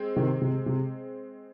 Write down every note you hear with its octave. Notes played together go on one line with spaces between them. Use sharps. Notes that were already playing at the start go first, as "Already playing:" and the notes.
Already playing: G#3 C4
C3 D#3
C3
C3